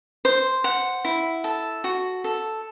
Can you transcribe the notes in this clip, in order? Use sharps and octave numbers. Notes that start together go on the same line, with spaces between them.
C5
F#5
E4
A4
F#4
A4